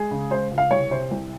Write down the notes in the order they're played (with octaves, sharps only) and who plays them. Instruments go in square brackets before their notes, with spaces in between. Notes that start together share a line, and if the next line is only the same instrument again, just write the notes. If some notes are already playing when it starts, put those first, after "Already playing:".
Already playing: [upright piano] G#3 G#4
C#3
G#3 C5
C#2
F5
C2 C#5
C3 C5
C2